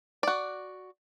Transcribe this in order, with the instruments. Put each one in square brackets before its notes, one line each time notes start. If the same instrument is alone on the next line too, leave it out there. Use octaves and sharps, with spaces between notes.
[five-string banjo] F#4 D5